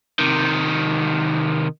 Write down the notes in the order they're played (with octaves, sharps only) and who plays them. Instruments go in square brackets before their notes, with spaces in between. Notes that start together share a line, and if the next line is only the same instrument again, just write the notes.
[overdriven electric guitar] C3 D#3